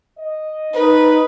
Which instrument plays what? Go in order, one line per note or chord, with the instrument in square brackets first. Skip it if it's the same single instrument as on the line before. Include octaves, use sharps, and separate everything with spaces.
[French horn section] D#5
[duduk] D#4 [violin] B4